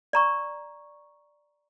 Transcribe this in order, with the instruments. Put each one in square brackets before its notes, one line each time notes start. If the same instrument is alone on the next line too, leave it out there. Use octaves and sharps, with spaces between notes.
[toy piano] D5 A#5 C#6